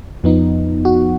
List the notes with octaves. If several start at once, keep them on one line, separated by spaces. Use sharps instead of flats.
F2 F3 B3 D#4
F#4